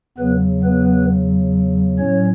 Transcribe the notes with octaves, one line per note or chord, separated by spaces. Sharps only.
E2 C#3 F#3 B3 B4
B3 B4
A2 F#3 C#4 C#5